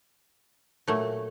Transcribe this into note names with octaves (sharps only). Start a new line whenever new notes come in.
A#2 F#3 A3